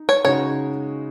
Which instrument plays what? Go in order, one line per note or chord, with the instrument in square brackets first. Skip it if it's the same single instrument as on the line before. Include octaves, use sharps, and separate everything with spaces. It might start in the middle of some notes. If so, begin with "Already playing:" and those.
Already playing: [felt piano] D#4
[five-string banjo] C#5
[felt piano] C#3 G#3 D#4 F#4 [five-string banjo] C#5